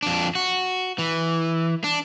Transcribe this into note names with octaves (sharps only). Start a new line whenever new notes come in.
F2 D4
F#4
E3
D4